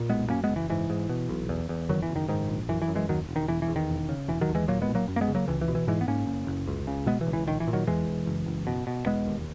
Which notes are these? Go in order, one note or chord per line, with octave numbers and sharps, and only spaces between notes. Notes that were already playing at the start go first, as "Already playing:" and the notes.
Already playing: A#2
B1 G#3 B3
F#2 A#3 C#4
G#3 B3
F#1
E3
G#2 E3
G#2
B2
B1
E2
E2
F#1 D#3 F#3
E3
F#1
D#3
G#2 D#3
A#1
F#2 E3
E3
F#2
E3 G#3
D#2 D#3 F#3
E1
D#3
E1 E3
E3
E2
D#3
E1
C#3
E1 E3
D#3 F#3
D#2
E3 G#3
A#2 F#3 A#3
G#3 B3
B1
F#3 A#3
F#2
A#3
G#3 B3
C#3
F#3 A#3
C#2 E3
E3
B2
E3
G#2 E3 G#3
B3
G#2 A#3 C#4
F#1
F#1
C#2
C#3
B2 G#3 B3
E3
C#2
E3
A#1 D#3
E3
A#2
D#3 F#3
E2 E3 G#3
E1
F#1
F#1
B2
B2
E1 G#3 B3
D#2